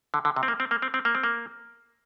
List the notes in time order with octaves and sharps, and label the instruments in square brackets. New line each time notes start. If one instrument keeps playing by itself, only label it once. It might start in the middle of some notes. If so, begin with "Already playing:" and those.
[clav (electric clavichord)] D3
D3
C3
C4
A#3
C4
A#3
C4
C4
A#3
C4
A#3